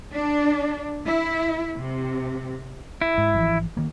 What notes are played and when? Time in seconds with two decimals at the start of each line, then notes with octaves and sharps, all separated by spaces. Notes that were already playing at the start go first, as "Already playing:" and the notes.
0.12 D4
1.05 E4
1.75 C3
3.02 E4
3.18 G#2
3.34 G#1 E3 F3
3.77 D#3 A#3